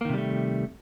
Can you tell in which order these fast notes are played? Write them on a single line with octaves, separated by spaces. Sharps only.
A#3 D#3 C3 G3 A3